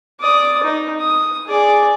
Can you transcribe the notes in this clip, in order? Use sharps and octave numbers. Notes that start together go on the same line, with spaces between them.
D5 D#6
D#4
D#6
G#4 D5